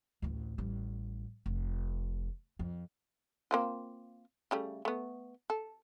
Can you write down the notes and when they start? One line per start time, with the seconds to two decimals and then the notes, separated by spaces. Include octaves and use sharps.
0.22 A1 D2
0.58 A1 G3
1.46 F1
2.59 F2
3.51 A#3 C4 F4
4.51 C#3 G3 A3
4.85 A3 B3
5.50 A4